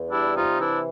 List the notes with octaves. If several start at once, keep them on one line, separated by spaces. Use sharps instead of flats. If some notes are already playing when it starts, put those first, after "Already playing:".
Already playing: E2
G3 D4 E4
C3 D#4 F4
E3 D4 E4